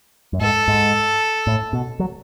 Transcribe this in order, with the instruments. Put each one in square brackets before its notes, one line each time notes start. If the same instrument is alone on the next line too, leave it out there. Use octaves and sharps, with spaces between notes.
[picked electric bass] F#2
[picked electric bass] G#2 [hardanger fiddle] A4
[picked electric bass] G#2
A2
B2
F#3